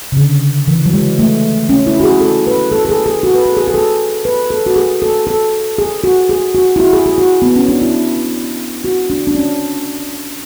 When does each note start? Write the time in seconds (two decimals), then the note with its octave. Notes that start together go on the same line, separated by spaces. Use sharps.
0.12 C#3
0.17 D3
0.68 E3
0.86 F#3
0.93 G#3
1.19 A3
1.69 C#4
1.87 E4
2.00 F#4
2.04 G#4
2.21 A4
2.47 B4
2.72 A4
2.85 A4
2.89 G#4
3.06 G#4
3.23 F#4
3.35 B4
3.46 A4
3.57 G#4
3.68 G#4
3.74 A4
4.25 B4
4.50 A4
4.66 F#4
4.76 G#4
5.02 A4
5.27 A4
5.78 G#4
6.04 F#4
6.29 G#4
6.54 F#4
6.76 E4
6.80 F#4
6.93 G#4
7.06 G#4
7.18 F#4
7.42 B3
7.56 C#4
7.68 D4
7.82 E4
8.84 F#4
9.10 D4
9.27 D4
9.35 C#4